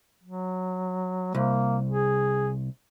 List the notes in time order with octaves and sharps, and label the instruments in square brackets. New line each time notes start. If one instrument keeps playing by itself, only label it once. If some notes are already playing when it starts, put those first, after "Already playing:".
[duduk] F#3
[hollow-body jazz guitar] C2 [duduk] A#3
[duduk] G#4